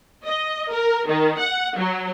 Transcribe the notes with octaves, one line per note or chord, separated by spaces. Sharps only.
D#5
A#4
D#3
F#5
F#3